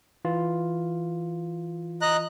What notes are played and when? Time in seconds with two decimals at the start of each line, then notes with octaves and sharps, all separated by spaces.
0.25 E3 F4
2.01 D#5 A#5 F#6